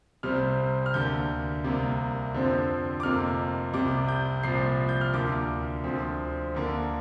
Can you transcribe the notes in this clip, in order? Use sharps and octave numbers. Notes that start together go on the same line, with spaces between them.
C2 C3 G3 C4 F6
F6
D2 D3 A#3 G6
C2 C3 A#3
F2 D3 F3 C4
D6
F1 F2 C3 A#3 F6
C2 C3 G3 D6
G6
C2 A#2 F3 C7
G6
F6
D2 D3 A#3 D6
D2 D3 F3 C4
D2 D3 A#3 D4